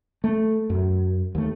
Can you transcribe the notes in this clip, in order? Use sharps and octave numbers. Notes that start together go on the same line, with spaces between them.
A3
F#2
D#2 A3